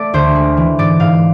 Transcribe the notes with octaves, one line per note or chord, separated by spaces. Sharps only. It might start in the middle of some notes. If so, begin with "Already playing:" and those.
Already playing: A3 A4 D5
D2 C5
G#3
E3
G#2 D5
G#2 F5